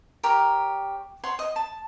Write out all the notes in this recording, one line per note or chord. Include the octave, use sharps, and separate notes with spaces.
G4 A#4 C#5 D6
C#5 F#5 C6
D#5
A5